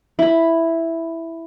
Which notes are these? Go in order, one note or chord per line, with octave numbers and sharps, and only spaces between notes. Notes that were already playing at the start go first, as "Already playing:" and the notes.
E4 B5